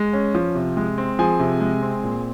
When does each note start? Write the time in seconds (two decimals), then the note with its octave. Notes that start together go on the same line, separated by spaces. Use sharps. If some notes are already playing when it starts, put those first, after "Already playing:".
Already playing: G#3
0.13 C#4
0.34 F3
0.55 C3
0.77 G#3
0.98 C4
1.19 F3 G#4 G#5
1.39 C3
1.61 G#3
1.82 C4
2.04 A#2